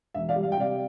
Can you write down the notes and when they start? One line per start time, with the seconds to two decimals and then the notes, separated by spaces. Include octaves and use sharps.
0.14 E1 E5
0.29 D5 F5
0.36 G3
0.43 F5
0.52 G5
0.58 C3 D5 F5